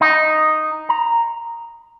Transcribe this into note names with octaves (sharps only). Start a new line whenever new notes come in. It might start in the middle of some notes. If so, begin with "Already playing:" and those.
D#4
A#5